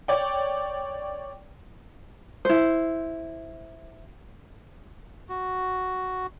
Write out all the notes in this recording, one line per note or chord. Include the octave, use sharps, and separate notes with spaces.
C#5 D5 G5
E4 C5
F#4